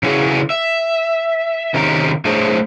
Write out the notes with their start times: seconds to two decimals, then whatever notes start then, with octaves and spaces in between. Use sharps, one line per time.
0.03 C#3 E3 C#4 F#4 G#4
0.50 E5
1.74 C3 D#3 C#4 G4 A#4
2.25 A3 D4 G#4 A#4 C5 C#5